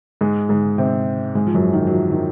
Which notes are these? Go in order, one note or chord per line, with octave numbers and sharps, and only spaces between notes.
G#2 G#3
G#2 G#3
C3 C4
G#2 G#3
F3
F#2 F#3
D#3
F#3
F3
D#3